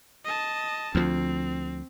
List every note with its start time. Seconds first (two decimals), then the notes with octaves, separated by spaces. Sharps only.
0.25 D#5 A5
0.95 D2 F3 C4